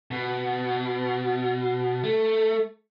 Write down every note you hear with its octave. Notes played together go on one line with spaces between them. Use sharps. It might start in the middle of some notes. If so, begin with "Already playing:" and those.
B2
A3